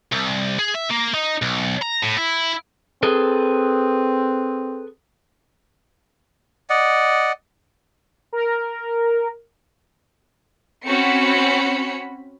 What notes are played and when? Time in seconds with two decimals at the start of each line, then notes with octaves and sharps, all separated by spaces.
0.12 C2
0.59 G#4
0.74 E5
0.90 A#3
1.14 D#4
1.42 B1
1.82 A#5
2.04 A2
2.18 E4
3.03 C4 G#4 A4 B4
6.70 D5 D#5 F#5
8.33 A#4
10.86 C4 C#4 F#4 B5 C#7